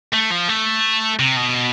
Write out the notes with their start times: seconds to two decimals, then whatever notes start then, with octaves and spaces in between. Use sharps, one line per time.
0.14 A3
0.31 F3
0.49 A3
1.19 C3
1.37 B2